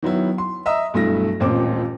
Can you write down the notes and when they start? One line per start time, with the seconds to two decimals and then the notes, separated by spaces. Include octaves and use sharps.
0.02 D#3 F#3 B3 E4
0.38 C6
0.66 D#5 E5 A#5 D#6 E6
0.94 B1 G2 A3 E4 A#6
1.40 D#1 A1 A#2 C4 D6